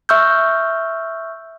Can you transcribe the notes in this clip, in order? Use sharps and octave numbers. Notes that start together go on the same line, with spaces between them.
E5 C#6 E6 F6 G6